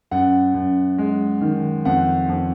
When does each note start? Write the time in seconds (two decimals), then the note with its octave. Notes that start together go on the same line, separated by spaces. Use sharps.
0.11 F#2 F#5
0.54 F#2
0.98 G#3
1.41 D#3
1.85 F2 F#5
2.29 F2